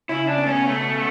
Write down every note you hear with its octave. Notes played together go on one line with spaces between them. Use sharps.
C#3 C#4 E4
D4
B3
A3 C#4
B2 B3
A3